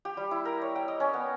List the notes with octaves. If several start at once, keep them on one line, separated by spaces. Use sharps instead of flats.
G4
G3
E4
A#4
C#5
G5
D#5
C#4
B3